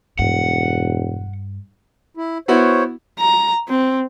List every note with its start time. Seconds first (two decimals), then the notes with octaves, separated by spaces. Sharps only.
0.19 E1 G2 F#5
2.17 E4
2.48 B3 E4 F#4 C5 C#5
3.19 A#5
3.68 C4